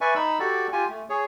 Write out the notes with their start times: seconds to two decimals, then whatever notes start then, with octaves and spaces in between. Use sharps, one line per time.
0.01 B4 D5 E5 G#5 C#6
0.16 D#4 B5 E6
0.39 F#4 G4 A4 D5
0.72 F4 G4 G#5
0.89 A3
1.10 G#4 C#5